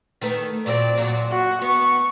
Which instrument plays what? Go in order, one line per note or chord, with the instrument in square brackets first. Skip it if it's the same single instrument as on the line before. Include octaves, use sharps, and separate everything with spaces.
[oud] D#3 A3 B4
[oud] A#2 F#3 C4 [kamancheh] D5
[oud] F#2 A#2 F#3
[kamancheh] F#4
[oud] B3 [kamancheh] C#6